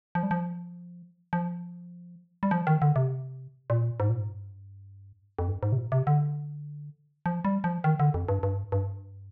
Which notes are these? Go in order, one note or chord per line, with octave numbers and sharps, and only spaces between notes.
F3
G3
F3
F3
G3
F3
D#3
D3
C3
A#2
G#2
A#2
G#2
G2
F2
G2
G#2
C3
A#2
C3
D3
F3
G3
F3
D#3
D3
F2
G2
G2
G2